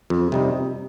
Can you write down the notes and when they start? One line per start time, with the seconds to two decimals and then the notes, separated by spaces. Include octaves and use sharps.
0.10 F2
0.32 C3 G3 D#4